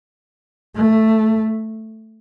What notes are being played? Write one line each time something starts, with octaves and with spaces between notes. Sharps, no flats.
A3